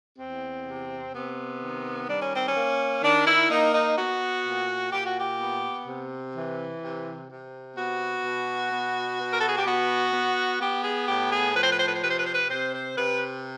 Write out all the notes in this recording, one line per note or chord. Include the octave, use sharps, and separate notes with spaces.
E2 C4
C3
C3 B3
D#3
G3 D4
C#4
C4
C#4
A#3
D#3 D4
E4
A#3 D#4
D#4
B3 F#4
A#2
A#2 G4
F#4
G4
B3
C3
E3
C3
C3
B3 F#4
B2
B3
B2
A#4
A4
G#4
G4
B3 F#4
B3
B3 G4
G#4
A2 G4
G#4
F3 B4
C5
B4
C5
B4
C5
C3 B4
C5
B4
C5
B4
C3 C5
C5
C3 B4